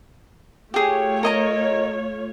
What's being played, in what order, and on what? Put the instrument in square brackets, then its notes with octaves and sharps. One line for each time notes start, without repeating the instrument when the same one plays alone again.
[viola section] A3 F4 C#5 [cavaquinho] G4 G#4
[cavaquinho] A#4 D#5 A#5